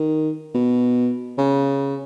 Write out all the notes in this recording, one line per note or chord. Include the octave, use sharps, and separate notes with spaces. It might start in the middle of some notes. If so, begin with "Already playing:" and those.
Already playing: D#3
B2
C#3